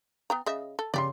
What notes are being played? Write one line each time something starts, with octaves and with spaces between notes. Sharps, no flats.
B3 G5 A#5
C#3 D#5 E5
A4
C#3 G4 D5 C6